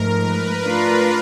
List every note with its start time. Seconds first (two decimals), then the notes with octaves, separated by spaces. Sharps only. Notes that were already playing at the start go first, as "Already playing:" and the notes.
Already playing: G#2 F3 A3 A#4
0.21 B4
0.62 A3 D4 F4 A#4